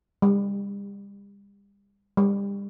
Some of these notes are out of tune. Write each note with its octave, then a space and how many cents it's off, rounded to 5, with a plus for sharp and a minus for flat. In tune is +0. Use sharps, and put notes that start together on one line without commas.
G3 +35
G3 +30